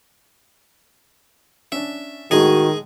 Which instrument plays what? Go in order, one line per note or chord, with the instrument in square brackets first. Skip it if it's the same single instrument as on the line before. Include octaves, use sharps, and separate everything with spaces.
[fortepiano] C#4 D4 [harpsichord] E5
[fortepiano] A2 G#3 D#4 [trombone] D#3 [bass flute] F#4 [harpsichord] G#4 D#5